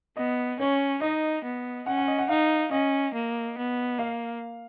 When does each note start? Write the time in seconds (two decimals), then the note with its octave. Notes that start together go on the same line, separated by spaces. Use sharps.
0.17 B3 D#5
0.59 C#4 C#5
1.01 D#4 D#5
1.45 B3
1.86 C#4 F#5
1.98 F#5
2.08 D#5
2.18 F#5
2.29 D#4 F5
2.71 C#4 D#5
3.14 A#3
3.57 B3
3.99 A#3 F5